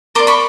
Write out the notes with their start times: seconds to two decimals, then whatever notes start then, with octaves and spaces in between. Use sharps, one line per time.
0.15 A#4 D5 C6 D6
0.27 B5 C#6